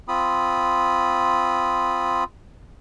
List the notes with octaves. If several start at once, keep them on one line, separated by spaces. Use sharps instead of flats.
C4 F4 B5 D#6